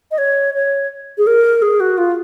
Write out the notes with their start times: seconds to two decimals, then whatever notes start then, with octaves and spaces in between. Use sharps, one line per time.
0.11 D#5
0.18 C#5
0.54 C#5
1.18 G#4
1.27 A#4
1.62 G#4
1.80 F#4
1.98 F4